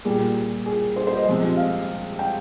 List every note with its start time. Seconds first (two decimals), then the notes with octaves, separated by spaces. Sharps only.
0.05 A#2 G3 G#4
0.66 G#4
0.96 C5
1.07 C5
1.17 D#5
1.27 C3 F3 G#3
1.57 F5
2.19 G5